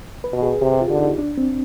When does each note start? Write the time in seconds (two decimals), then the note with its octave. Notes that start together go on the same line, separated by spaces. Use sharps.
0.24 B4
0.33 B2
0.42 G#4
0.62 C3 G4
0.81 F4
0.90 D3
0.99 D#4
1.18 D4
1.38 C4